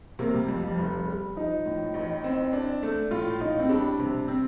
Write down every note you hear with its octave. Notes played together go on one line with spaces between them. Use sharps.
C3 A#3
G3
F2 G3
F3
F1 G3
G3
F3 D#4
A2
A1
C4
D4
A3
A2 F4
A2 D#4
C4
G3 D4
C3
C4